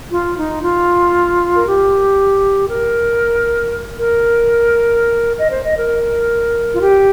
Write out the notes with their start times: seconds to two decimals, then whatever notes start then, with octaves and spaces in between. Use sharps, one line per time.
0.11 F4
0.37 D#4
0.62 F4
1.55 A#4
1.65 G4
2.69 A#4
3.97 A#4
5.39 D#5
5.52 C5
5.64 D#5
5.77 A#4
6.72 F4
6.80 G4